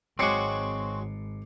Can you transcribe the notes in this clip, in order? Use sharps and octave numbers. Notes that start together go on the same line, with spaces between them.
G#1 F#3 G#3 C4 F#4 D6 C7 C#7